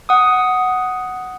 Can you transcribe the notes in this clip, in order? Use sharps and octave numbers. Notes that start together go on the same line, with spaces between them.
F#5 D#6